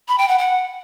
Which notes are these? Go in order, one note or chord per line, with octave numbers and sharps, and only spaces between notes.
B5
G5
F#5
F#5